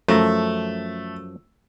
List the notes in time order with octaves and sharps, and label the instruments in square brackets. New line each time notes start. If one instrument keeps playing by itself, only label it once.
[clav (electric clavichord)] F#2 F3 A#5 [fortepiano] A3